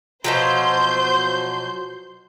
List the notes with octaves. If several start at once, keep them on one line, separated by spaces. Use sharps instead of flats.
B2 F3 F#3 C5 C6 G6